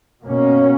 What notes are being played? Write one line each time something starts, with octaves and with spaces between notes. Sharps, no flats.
B2 A#3 C#4